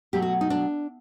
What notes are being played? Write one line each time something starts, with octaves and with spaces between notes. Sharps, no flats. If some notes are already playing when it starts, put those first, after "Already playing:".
B2 F#3 A3 G4
F#4
D#4
D4